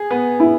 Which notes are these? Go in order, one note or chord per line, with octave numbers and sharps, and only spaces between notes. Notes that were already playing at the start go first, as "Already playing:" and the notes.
Already playing: G#4
B3
E4